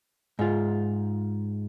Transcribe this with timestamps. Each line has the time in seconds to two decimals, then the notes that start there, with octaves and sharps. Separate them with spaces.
0.39 G#2 F4